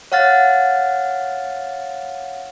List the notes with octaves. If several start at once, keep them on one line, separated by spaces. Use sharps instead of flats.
C#5 F5 F#5 F6 A6